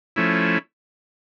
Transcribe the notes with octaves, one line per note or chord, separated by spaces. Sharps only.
F3 A3 C#4 E4